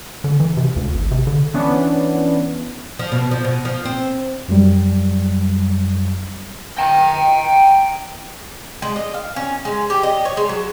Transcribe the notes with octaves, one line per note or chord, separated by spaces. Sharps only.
D3
E3
C3
D2
G#1
C3
D3
E3 B3 C#4 D4
F3
B2
F3
B2
F3
C4
F#2 F#3 G3
G5 A#5
G#3
D#5
F5
C#4
G#3
G4
D#5
C#5
G#3
F#3